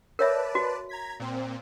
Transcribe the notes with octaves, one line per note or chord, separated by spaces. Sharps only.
A#4 B4 C#5 D5 E5 A5
F#4
A#5 G#6 B6
A#2 C4